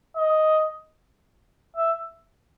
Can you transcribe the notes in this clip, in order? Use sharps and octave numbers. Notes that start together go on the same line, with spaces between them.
D#5
E5